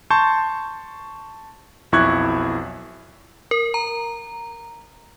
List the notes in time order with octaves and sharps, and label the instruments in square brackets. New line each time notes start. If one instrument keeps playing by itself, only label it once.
[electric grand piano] A5 C6 C#6 G6
B1 F2 E4 C#6 F#6 G#6
[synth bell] A#4
A#5